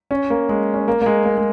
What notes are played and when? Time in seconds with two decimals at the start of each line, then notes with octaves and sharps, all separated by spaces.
0.11 C#4
0.30 A#3
0.49 G#3
0.74 C#4
0.88 A#3
1.02 A#3
1.06 G#3
1.25 A#3
1.37 G#3